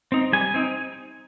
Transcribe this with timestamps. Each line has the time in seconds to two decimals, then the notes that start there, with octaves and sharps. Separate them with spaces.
0.12 C4 D#4
0.33 G3 G#5
0.54 C4 D#4